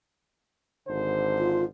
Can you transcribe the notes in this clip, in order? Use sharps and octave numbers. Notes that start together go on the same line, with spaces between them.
G#1 D3 C5
F4